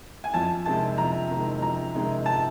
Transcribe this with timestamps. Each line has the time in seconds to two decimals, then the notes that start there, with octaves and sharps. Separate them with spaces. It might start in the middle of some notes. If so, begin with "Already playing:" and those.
0.24 G#5
0.34 F2 A5
0.66 C3 D#3 G#3 A5
0.98 F2 A#5
1.30 C3 D#3 G#3
1.62 F2 A#5
1.95 C3 D#3 G#3
2.26 A5